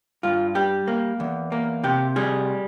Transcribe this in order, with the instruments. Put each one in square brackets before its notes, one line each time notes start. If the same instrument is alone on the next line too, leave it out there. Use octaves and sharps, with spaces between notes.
[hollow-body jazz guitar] G2 F4
G3 G4
A#3
E2
A#3
C3 G4
G3 G#4